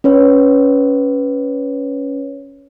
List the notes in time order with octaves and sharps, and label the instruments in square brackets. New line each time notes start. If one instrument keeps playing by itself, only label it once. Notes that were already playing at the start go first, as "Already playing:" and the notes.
[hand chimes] C#4 B4 C#5